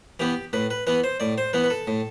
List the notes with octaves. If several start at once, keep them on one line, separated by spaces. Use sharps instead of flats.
E3 B3 G4
A2 B4
B4
E3 B3 B4
C5
A2 D5
C5
E3 B3 B4
B4
A4
A2